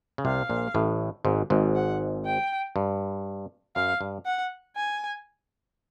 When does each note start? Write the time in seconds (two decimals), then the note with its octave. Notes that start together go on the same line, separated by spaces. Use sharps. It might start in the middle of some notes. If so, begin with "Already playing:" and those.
0.18 C#3
0.25 C2 C3 F5
0.50 A#1 A#2
0.75 A1 A2
1.25 G#1 G#2
1.50 G#1 G#2
1.75 F#5
2.26 G5
2.76 G2
3.76 F#2 F5
4.01 G2
4.26 F#5
4.76 G#5